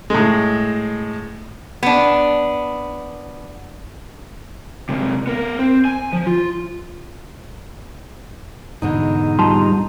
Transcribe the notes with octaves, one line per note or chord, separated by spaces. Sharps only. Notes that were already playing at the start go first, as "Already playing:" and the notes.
A2 G#3
B3 D4
C3 G#3
B3 A#4
C4
G#5
F3
F4
E2 G#2 B2 D3 D#4
G3 F4 A5 A#5 C6